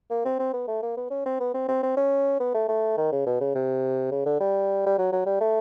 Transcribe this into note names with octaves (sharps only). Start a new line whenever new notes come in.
A#3
C4
C4
B3
A3
A#3
B3
C#4
C4
B3
C4
C4
C4
C#4
B3
A3
A3
D#3
C#3
B2
C#3
C3
C#3
D3
G3
G3
F#3
F#3
G3
A3